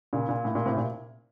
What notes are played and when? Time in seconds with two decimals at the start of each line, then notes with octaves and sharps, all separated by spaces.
0.13 A#2 C#3
0.29 A#2
0.45 A2
0.55 A#2
0.66 A2 C3
0.77 A#2